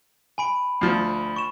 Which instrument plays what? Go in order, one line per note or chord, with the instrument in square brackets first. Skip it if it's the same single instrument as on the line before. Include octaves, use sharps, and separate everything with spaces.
[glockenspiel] G#5 B5 D7
[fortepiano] D2 F3
[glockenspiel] C#6 E7